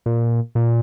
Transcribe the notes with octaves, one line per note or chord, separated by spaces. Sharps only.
A#2
A#2